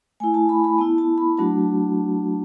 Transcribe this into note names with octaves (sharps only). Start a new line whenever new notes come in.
A3 E4 G#5
A5
B5
B5
B3 E4 A5
A5
B5
F#3 A3 D4 F#4 A5